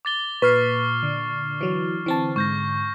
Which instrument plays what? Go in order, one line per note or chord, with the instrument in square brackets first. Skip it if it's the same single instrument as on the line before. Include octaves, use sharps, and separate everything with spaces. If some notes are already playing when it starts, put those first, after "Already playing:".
[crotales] D6 A6 G7
[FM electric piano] A#2 [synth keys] B4 [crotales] C#6 F6 C7
[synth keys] D3
[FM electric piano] E3 F#3
E3 C4 A5
[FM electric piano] G#2 [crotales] C#6 G6 A#6